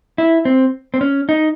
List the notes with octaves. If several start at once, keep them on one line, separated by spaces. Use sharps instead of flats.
E4
C4
C4
C#4
D#4